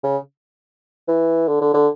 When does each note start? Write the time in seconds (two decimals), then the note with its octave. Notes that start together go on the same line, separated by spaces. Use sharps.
0.03 C#3
1.08 E3
1.47 D3
1.61 D3
1.74 D3